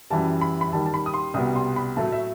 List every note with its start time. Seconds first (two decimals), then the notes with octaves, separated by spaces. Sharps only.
0.10 F#2 E3 G3 A5
0.41 B5
0.61 B5
0.72 D#2 D#3 G3 A5
0.86 A5
0.94 B5
1.06 D#6
1.14 C6
1.34 C2 B2 G3 B3 D#6
1.56 C6
1.76 B5
1.97 A2 F#3 A3 A5
2.12 E5